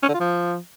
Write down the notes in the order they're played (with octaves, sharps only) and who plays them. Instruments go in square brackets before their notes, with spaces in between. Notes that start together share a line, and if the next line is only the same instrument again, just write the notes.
[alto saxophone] C#4
D3
F4
F3